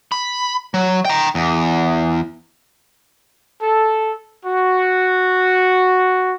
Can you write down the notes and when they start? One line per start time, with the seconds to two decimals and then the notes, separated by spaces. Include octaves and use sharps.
0.12 B5
0.74 F#3
1.05 G5 A#5
1.35 E2
3.62 A4
4.46 F#4